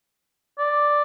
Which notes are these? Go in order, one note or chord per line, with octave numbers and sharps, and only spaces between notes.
D5